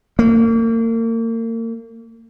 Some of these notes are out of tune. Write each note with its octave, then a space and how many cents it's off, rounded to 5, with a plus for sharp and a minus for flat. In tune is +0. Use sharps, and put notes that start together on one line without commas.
A#3 -35